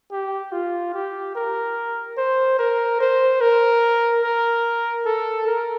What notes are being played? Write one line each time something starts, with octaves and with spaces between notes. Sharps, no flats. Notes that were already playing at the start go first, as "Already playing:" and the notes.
G4
F4
G4
A#4
C5
A#4
C5
A#4
A#4
A4
A#4